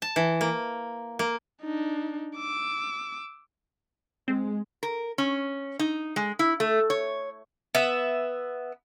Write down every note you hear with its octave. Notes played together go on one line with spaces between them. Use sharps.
A5
E3
A#3
A#3
D4 D#4
D6 E6
G#3 C4
A#4
C#4
D#4
G#3
E4
A3
C#5
B3 E5